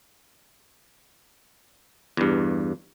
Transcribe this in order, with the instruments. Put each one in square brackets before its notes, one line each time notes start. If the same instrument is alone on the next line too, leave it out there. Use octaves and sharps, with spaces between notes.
[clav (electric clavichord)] E2 G2